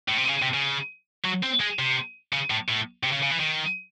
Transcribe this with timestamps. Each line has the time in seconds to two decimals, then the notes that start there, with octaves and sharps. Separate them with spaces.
0.09 A2
0.18 C3
0.29 C#3
0.42 C3
0.54 C#3
1.25 F#3
1.43 C4
1.60 G#3
1.79 C3
2.33 C#3
2.50 A2
2.69 A2
3.04 C3
3.13 C#3
3.23 C#3
3.31 E3
3.40 D#3